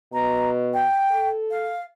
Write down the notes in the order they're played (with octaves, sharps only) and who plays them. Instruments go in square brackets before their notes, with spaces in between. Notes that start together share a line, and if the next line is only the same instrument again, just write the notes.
[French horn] B2 [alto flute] A#5
[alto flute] G5
[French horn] A4
[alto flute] F5